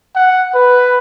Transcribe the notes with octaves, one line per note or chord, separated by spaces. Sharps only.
F#5
B4